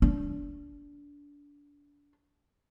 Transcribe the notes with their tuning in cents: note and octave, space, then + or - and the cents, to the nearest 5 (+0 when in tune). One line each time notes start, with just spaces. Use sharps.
D4 -25